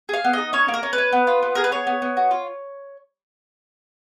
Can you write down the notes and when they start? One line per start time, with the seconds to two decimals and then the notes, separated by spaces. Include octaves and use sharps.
0.09 G#4 F5
0.24 B3
0.33 D#4 D#5
0.53 C#4 C#5
0.68 A#3
0.74 A#4
0.83 C#4
0.93 B4
0.98 C#4
1.13 B3
1.27 F4
1.43 B3
1.55 G#4 A#4
1.64 B4
1.71 B3 C#5
1.87 B3
2.02 B3
2.17 F#4
2.31 F4